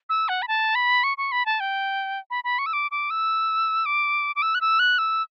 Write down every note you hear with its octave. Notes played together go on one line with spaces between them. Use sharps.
E6
F#5
B5
A5
B5
C#6
C#6
B5
A5
G5
B5
B5
C#6
E6
D6
D6
E6
D6
D6
E6
F#6
E6
F#6
E6